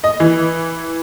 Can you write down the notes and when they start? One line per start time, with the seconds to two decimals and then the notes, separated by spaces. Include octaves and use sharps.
0.04 D#5
0.20 E3